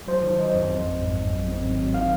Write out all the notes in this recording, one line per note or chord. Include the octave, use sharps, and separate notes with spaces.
F#3 C5
D#3
F#3 D#5
F2
G#1
G#1
G#2
G#1
F#3
C4
G#1
F#3
D#3 F5